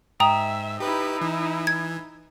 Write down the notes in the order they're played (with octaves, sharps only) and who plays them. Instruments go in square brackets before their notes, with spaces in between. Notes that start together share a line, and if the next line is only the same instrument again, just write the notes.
[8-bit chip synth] G#2 [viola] E5 [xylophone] G5 A#5 D#6
[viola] D#4 E4 [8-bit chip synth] G4 B4
[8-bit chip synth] E3
[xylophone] G#6